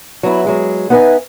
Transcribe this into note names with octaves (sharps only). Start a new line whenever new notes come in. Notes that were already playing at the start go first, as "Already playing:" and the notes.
F#3 B3 E4
F#3 G#3 G#4
B3 D#4 B4 C5 E5 G#5